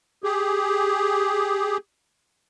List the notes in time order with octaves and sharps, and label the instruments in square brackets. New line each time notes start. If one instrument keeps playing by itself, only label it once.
[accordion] G4 G#4